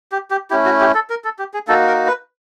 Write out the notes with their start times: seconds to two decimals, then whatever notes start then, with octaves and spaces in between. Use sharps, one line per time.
0.12 G4
0.31 G4
0.50 A3 C#4 E4 G4
0.65 F#4
0.81 G4
0.95 A4
1.10 A#4
1.24 A4
1.39 G4
1.54 G#4
1.68 A#3 D#4 F#4 A4
1.87 A#4
2.07 B4